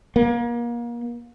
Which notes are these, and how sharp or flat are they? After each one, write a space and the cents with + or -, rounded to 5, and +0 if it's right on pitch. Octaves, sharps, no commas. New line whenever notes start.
A#3 +30